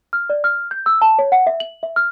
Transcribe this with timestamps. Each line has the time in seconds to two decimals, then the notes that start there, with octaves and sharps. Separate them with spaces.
0.13 F6
0.30 D5
0.44 F6
0.71 G6
0.86 E6
1.01 A5
1.19 C#5
1.32 F#5
1.47 E5
1.60 F#7
1.83 E5
1.96 F6